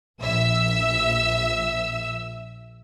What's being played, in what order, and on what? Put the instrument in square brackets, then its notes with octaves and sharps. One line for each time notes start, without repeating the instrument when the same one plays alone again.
[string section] A#1 E5 E6